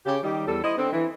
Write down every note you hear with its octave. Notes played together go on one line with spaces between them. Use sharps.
C#3 G4
D#3 G3 D#4 G4
E2 G3 A4
E4 C5 D#5
D3 C4
E3